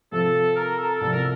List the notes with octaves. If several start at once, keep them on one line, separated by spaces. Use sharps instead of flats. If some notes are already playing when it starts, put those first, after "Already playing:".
C3 F3 C4 A4
A#4
A4
C2 C3 F3 A4
A#4